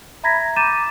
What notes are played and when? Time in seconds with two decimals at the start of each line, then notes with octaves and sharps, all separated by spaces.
0.23 E5 A#5 B5 G#6 A#6 B6
0.56 A#5 D6 G6 A6 D#7 E7